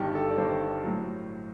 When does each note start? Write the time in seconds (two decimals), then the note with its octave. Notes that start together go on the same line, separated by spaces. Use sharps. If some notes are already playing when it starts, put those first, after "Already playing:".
Already playing: G1 G2 D#3 G4
0.15 A4
0.30 D5
0.37 G1 G2 D#3 C5
0.84 A2 F#3